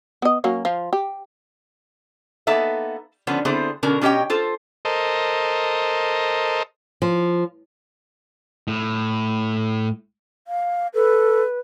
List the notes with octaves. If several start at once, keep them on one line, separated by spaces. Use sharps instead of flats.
B3 D#5
F#3 A#3 C#4
F3 F4
G4
A#3 B3 D#4 A4 E5
D3 F3 B3 C#4
D3 B3 C4 E4 G#4 C5
B2 D3 C#4 A#4
B2 C#4 G4 C#5 D#5 G5
F4 A4 C5
A4 A#4 C5 D#5
F3
A2
F5
A4 B4